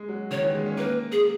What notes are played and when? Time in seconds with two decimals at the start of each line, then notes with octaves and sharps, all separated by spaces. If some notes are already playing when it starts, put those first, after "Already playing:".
Already playing: G#3
0.09 F#3
0.31 D#3 C#5
0.42 E3
0.55 G#3
0.66 C#4
0.77 A#3 B4
1.12 G#4